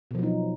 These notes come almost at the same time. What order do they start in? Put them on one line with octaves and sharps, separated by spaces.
B2 F3 F#3 D#4